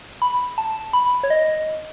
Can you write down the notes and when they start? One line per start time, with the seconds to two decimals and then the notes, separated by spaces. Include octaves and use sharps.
0.22 B5
0.58 A5
0.93 B5
1.23 C#5
1.30 D#5